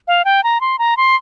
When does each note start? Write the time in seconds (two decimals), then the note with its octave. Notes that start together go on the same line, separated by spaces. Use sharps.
0.08 F5
0.25 G5
0.44 A#5
0.61 C6
0.79 A#5
0.97 C6